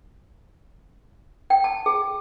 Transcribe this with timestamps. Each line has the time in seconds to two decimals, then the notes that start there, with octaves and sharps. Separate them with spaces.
1.50 G5
1.64 A5
1.86 G#4